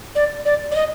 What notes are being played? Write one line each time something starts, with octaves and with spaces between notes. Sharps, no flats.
D5
D5
D5
D#5